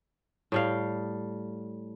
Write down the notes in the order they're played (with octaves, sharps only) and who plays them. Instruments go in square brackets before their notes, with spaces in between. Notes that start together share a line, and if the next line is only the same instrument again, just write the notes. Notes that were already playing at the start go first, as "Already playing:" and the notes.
[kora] A2 G3 F5